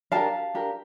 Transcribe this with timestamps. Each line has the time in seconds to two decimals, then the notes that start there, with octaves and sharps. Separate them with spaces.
0.12 D4 G4 A#4 F5 A5
0.54 D4 G4 A#4